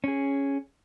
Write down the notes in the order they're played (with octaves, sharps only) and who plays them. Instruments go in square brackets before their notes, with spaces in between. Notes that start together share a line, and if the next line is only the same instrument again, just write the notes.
[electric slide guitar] C#4 G#4